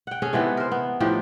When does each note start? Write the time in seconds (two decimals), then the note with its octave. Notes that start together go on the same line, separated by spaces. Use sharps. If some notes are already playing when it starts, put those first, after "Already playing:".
0.07 F#5 G5
0.22 C#4 G#4 A4
0.33 C3 E3 B3 D#4
0.57 A#4 C5
0.72 B3
1.00 A2 F3 D#4 G4